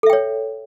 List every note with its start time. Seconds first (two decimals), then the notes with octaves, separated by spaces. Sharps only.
0.03 A4
0.06 E5
0.10 G5
0.13 C#5